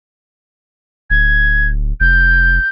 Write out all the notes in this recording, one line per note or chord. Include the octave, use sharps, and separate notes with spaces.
D1 G#6
F1 G6